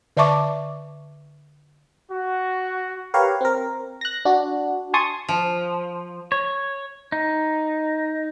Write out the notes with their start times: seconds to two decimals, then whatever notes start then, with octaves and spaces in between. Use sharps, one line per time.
0.17 D3 D5 E5 A5 C#6 D6
2.11 F#4
3.14 G4 A#4 B4 C#5 F5
3.41 C4 A#4
4.01 F#6 A#6
4.25 D4 F#4
4.94 G#5 A5 C6 C#6 D#6
5.29 F3
6.32 C#5
7.12 D#4